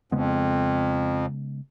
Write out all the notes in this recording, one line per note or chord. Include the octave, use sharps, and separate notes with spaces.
F2 C#3 G#3 B3